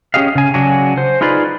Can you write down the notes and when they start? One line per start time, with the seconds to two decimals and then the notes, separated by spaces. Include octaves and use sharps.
0.14 C#4 G4 G#4 D#5 F5
0.35 C#3 G#5
0.54 C#3 F#3 D4 F#4 G#5
0.98 C5
1.21 D#4 F4 G#4 B4 C5 D5